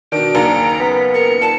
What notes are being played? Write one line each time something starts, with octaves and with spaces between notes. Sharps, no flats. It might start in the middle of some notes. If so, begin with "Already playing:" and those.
B2 D#3 D4 D7
F#1 D#2 A#5
B3 B6
A#4 C#7
A#2 A5